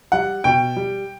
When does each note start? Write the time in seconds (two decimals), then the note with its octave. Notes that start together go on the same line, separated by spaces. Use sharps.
0.12 G3 F#5
0.44 B2 G5
0.76 G3